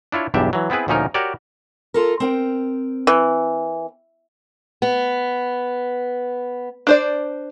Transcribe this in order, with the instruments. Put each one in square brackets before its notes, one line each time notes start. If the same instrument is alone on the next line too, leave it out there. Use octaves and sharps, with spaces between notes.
[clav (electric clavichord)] D4 E4 F4 C#5
B1 E2 G2 D4 G4 E5
E3 F#3
B3 C4 E4 G#4 B4
D2 A#2 F3 C#4 D#4 A#4
F#4 G4 A#4 C#5 D5
[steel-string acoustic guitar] F4 A4 A#4
C4 A#4 G5
[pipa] E3
[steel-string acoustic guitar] B3
[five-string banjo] D4 C5 D5